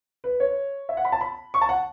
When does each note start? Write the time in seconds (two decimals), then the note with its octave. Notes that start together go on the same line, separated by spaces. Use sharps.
0.24 B4
0.40 C#5
0.89 E5
0.97 F#5
1.05 B5
1.12 A5
1.21 B5
1.54 C#6
1.61 A5
1.69 F#5